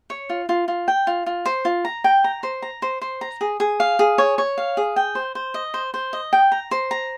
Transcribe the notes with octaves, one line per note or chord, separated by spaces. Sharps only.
C#5
F4
F4
F4
G5
F4
F4
C5
F4
A#5
G5
A#5
C5
A#5
C5
C5
A#5
G#4
G#4
F5
G#4
C#5
C#5
F5
G#4
G5
C5
C5
D#5
C5
C5
D#5
G5
A#5
C5
A#5